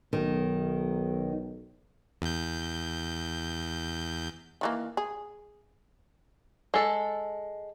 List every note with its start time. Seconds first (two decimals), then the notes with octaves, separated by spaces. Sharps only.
0.13 B1 D#3
2.22 E2 G6
4.61 D#3 E3 A#3
4.97 G#4
6.74 G#3 A4